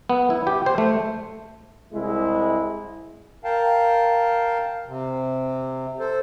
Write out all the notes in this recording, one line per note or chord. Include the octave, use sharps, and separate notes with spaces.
B3
E4
G4
C5
A3
C2 G#3 E4
A#4 F5 G5 A5
C3
A4 C5